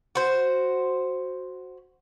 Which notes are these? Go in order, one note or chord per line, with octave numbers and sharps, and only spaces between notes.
F#4 C5